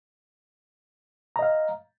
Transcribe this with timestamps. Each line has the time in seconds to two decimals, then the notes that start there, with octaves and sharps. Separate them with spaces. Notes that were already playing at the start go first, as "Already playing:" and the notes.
1.36 A#5
1.39 D#5
1.42 F5